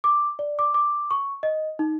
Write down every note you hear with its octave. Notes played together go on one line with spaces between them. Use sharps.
D6
D5
D6
D6
C#6
D#5
D#4